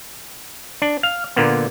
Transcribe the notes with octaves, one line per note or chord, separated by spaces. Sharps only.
D4
F5
A#2 D3 A#3 B3